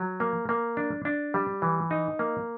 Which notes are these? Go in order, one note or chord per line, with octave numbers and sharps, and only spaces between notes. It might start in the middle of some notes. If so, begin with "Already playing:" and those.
Already playing: F#3
A#3
A#3
D4
D4
G3
E3
D#4
A#3